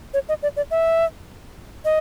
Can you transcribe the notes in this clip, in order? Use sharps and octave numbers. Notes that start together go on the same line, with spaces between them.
C#5
D#5
D5
D5
E5
D#5